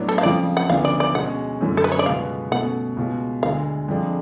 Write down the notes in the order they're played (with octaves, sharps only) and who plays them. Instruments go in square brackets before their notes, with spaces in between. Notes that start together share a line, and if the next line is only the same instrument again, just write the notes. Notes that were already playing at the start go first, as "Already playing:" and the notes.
Already playing: [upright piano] A2 F#3 B3 D4
[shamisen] A4
F5
[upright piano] F2 C#3 F3 [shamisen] D5
[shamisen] F#5
[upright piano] D2 C#3 F3 B3 D4 [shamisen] F5
[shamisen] D5
D5
[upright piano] B2 G#3 C#4 [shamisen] F#5
[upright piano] F#2 D3 F#3 A3
[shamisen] A4
B4
C#5
D5
[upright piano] C#2 B2 G#3 B3 [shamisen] F5
[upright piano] B2 A3 C#4 [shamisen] F#5
[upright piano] C#2 B2 G#3
[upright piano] D2 D3 G#3 [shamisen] F5
[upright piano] F2 F3 G#3 D4